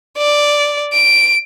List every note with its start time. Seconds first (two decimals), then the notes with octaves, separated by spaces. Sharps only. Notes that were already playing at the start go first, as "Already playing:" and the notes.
0.18 D5
0.93 D7